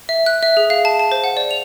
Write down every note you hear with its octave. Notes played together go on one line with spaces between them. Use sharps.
E5
F#6
E5
G#4
F5
A5
A5
C5
F#5
D5
F7